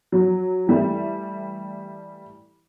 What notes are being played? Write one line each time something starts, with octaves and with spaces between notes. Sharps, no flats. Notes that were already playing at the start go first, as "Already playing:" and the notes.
F#3
E3 G3 A3